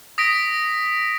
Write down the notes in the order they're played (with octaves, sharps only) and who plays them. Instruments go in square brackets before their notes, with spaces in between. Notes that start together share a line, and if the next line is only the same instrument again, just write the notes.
[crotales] D#6 A#6 B6 D7